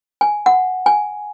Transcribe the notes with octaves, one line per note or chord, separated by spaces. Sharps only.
G#5
F#5
G#5